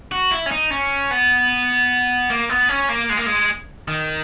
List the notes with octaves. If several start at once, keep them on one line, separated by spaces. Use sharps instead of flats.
F#4
E4
C#4
D#4
C#4
B3
A#3
B3
C#4
A#3
G#3
A#3
G#3
D#3